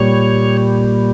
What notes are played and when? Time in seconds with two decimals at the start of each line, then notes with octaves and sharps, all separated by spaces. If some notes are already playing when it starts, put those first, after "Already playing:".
Already playing: A#2 G3 C#5